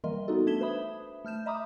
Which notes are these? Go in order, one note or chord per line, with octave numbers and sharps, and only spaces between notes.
E3 G3 A#3 A#4 D#5 C6
B3 D#4 F#4 A4
A3 D4 G#6 B6 E7 G7
B4 C5 E5 B5 D#6
A3 F6 G6 E7
D#5 E5 A#5 B5 D6 D#6